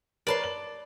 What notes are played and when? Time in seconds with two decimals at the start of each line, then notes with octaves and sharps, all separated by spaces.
0.27 A#4 B4 C#5 D5 A5 C6
0.44 F#7